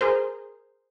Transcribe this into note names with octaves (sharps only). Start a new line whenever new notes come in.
G#4 A#4 C5